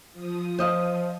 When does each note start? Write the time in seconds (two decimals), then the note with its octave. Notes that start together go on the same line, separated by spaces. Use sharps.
0.13 F3 D#6
0.59 C5 D#5 F5